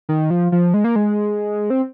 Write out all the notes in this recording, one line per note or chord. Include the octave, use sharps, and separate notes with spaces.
D#3
F3
F3
G#3
A#3
G#3
C4